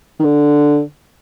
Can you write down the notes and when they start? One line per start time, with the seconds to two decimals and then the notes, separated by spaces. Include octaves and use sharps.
0.20 D#3
0.24 D3